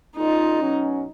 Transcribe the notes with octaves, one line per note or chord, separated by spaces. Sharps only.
A#2 G#3 C#4 D#4 F4
B2 F#3 C#4